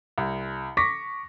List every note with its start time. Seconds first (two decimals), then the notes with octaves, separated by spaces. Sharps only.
0.18 C2
0.77 C#6 D6 A#6 B6